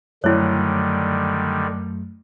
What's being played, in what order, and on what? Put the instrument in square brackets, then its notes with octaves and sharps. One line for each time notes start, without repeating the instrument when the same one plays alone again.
[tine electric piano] F#2 F#3 A3 [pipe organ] D3 D#3 G3 [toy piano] E4 C#5